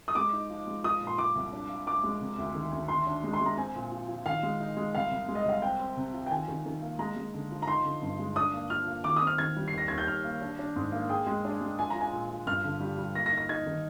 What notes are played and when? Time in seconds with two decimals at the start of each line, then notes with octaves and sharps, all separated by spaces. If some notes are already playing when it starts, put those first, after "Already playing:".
0.08 D#6
0.15 G#3 D6
0.33 D#4
0.50 F3
0.67 G#3
0.84 F3 D#6
1.00 A#2
1.07 C6
1.18 F3 D6
1.35 C2
1.53 D4
1.69 F4
1.86 F3 D6
2.04 G#3
2.21 C3
2.38 D2
2.55 D#3
2.72 D2
2.88 D#3 C6
3.07 D4
3.24 G#3
3.33 C6
3.41 G#3
3.46 A#5
3.57 C4 G#5
3.75 A#2
3.92 F3
4.08 F3
4.26 D#3 F5
4.43 G#3
4.60 D#4
4.77 G#3
4.95 C2 F5
5.11 C2
5.28 G#3
5.35 D#5
5.45 C2 F5
5.62 C4 G5
5.80 C4
5.97 C3
6.13 F3
6.26 G5
6.31 D#3 G#5
6.48 D#3
6.66 D#3
6.82 A#3
6.99 G#3 A#5
7.16 G#3
7.33 D3
7.51 F3
7.62 A#5
7.68 D#4 C6
7.84 D3
8.02 G2
8.19 G#3
8.36 D4 D#6
8.53 A#3
8.70 F3 F6
8.87 A#3
9.04 D#3 D6
9.16 D#6
9.21 C4
9.27 F6
9.38 D#3 G#6
9.56 G3
9.68 C7
9.73 D#2
9.78 A#6
9.88 D#2 G#6
9.98 G6
10.07 D#2 F6
10.24 A#3
10.41 D4
10.59 D4
10.76 G#2
10.92 A#3
11.09 G#4 G5
11.27 G#3
11.45 D4
11.61 G#3
11.79 F3 G#5
11.90 F3 A#5
12.01 G#5
12.12 A#2
12.29 F3
12.46 G2 F6
12.64 D3
12.80 G3
12.98 G3
13.15 A#3 A#6
13.26 A#6
13.32 D#4
13.38 A#6
13.49 D#4 G#6
13.66 D#3